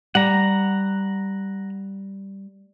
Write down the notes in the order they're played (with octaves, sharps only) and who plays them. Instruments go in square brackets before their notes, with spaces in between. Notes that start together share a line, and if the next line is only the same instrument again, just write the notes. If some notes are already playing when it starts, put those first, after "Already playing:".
[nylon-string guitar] G3 [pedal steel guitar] F#5 A#5